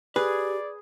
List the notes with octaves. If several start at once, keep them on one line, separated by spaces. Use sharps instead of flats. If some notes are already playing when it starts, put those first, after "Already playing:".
G4 G#4 B4 D5